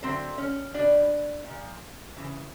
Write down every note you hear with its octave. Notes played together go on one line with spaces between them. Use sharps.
D3 F#3 A3 C4 C5
C#4 C#5
B2 G3 D4 D5
A#2 F3
C#3 E3